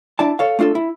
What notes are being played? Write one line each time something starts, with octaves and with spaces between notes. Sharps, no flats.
D4 E4 D5 A5
A4 C#5 F5
A3 D4 F4 G4 A4
E4